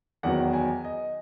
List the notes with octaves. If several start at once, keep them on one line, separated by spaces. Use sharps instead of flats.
E2 D#3 F#3 B3 F#5
G#5
D#5